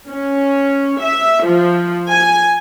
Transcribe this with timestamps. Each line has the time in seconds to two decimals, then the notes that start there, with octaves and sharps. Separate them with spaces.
0.11 C#4
1.02 E5
1.45 F3
2.11 G#5